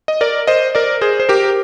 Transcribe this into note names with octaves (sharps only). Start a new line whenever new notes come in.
D#5
A#4 D5
C5 D#5
A#4 D5
G#4 C5
C5
G4 A#4